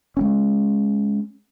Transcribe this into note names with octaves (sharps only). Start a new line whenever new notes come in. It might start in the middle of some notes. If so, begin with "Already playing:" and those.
G#3 B3 C#4